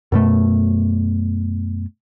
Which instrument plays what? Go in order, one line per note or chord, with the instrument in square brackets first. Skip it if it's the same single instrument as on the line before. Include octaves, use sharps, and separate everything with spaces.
[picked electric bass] F#2 B2 A3